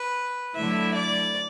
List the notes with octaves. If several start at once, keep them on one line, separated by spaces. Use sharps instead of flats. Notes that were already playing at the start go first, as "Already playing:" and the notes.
Already playing: B4
D3 F#3 A3 E4 E5
D5